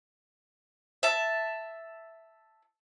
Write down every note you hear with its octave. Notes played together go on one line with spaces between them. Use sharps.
E5 A5